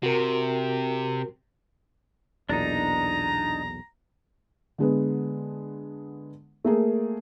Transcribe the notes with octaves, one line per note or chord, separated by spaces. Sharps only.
C3 F#4 A#4
B1 E2 A#2 D4 D#4 A#5
D3 G#3 B3
A3 A#3 G#4